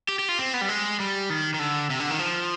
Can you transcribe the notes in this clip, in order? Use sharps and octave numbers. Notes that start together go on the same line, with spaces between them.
G4
G4
F4
C4
B3
G3
G#3
G3
D#3
D#3
D3
C3
D3
D#3
F3